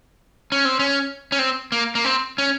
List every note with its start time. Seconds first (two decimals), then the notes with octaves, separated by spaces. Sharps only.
0.52 C#4
0.65 C4
0.79 C#4
1.32 C#4
1.39 C4
1.72 A#3
1.95 A#3
2.05 C4
2.38 C#4